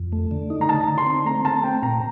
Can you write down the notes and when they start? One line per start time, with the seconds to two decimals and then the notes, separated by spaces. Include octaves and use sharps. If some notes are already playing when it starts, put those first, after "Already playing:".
Already playing: F2
0.12 A3
0.31 D3
0.50 D#4
0.61 A#5
0.69 D3 A5
0.88 D3
0.98 C6
1.06 C4
1.25 A3 A#5
1.45 A3 A5
1.64 C4 G5
1.83 A#2 A#5